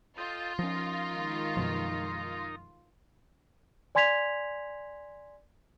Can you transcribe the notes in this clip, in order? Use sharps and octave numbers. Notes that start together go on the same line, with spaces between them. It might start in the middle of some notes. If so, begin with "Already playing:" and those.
F4 A4 D#5 G5
F3 C#4 D#4 A#4
D#3 G#3
F#2 B2 F3
D5 G#5 C6 G#6 B6 F7